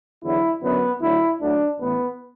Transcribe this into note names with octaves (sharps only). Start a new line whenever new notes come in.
E2 D3 F#3 E4
F#2 D3 F#3 B3
D2 D3 F#3 E4
D2 D3 F#3 D4
A1 A2 E3 B3